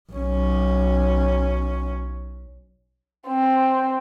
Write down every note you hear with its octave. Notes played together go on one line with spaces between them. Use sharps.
B1 C#4
C4